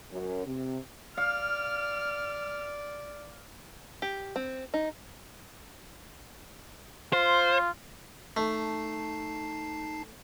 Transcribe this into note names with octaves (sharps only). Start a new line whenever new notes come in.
F#2
C3
D5 F5 F6
G4
C4
D#4
F4 C5
A3 D#4 A5 C7